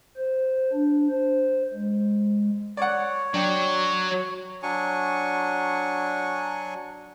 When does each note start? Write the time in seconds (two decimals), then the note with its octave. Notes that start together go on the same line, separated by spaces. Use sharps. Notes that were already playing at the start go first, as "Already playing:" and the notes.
0.17 C5
0.73 D4
1.10 C5
1.73 G#3
2.77 C#5 D5 F#5
3.34 F#3 D4 G5
4.63 F#3 D4 G#5 C#6